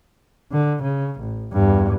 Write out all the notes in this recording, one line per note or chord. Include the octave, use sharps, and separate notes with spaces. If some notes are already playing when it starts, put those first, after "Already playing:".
D3
C#3
A1
E2 G2